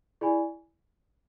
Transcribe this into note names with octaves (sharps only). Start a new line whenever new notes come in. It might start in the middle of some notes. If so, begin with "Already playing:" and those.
E4 G#4 D5 G#5 B5